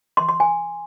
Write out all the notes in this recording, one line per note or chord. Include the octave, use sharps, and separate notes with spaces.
C6
C6
G#5